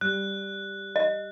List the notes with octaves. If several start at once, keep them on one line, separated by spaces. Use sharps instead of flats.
G3 F#6
D#5